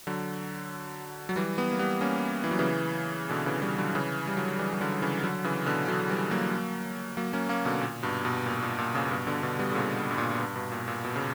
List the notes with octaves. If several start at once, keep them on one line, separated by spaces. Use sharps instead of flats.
D3 F#3
F#3
E3 G3
G3 B3
A#3
G3 B3
A#3 C#4
E3
F#3
C#3 E3
B2 D3
C#3 E3
E3 G3
D3 F#3
C#3 E3
G3
D3 F#3
E3 G3
G3
D3 F#3
C#3 E3
D3 F#3
C#3 E3
B2 D3
D3 F#3
E3 G3
F#3 A#3
F#3 A#3
A#3 C#4
A#3 C#4
B2 D3
A#2
G2 B2
G2 B2
A#2
A#2
A#2
A#2 C#3
A#2
G2 B2
B2 D3
B2 D3
G3 B3
D3
A#2 C#3
G2
A#2
A#2
G2
G2 B2
A#2
A#2
B2
C#3